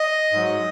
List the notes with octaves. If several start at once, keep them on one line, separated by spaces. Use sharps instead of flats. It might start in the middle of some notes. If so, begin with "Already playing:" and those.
Already playing: D#5
G#2 F#3